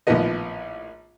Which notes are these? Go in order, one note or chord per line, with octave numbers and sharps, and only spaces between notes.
A#1 A2 D#3 F3 B3 D#5